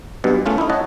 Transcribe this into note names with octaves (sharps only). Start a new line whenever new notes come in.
B1 G2 B2
A2 A3 C#4 F4
D#4 E4
C#5 D#5 F#5 A5